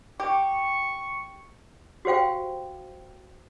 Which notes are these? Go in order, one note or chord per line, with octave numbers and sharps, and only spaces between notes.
G4 C#6
F#4 G4 C5 F5 G5